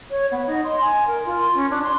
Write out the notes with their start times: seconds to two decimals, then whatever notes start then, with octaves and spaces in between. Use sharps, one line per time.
0.11 C#5
0.31 B3
0.47 D#4
0.64 C6
0.81 G#5
1.07 A#4
1.26 F4
1.54 C#4
1.70 D4
1.84 C6